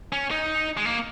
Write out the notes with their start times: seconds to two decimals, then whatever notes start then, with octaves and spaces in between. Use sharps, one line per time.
0.12 C#4
0.31 D#4
0.77 G#3
0.85 A#3